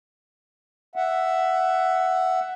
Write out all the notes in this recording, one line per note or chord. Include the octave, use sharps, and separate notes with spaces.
E5 F#5